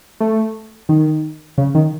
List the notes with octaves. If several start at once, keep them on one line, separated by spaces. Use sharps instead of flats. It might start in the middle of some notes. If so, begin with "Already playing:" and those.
A3
D#3
C#3
D#3